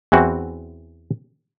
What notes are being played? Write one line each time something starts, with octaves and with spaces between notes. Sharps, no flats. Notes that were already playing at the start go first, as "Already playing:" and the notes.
E2 E3 C4 F#4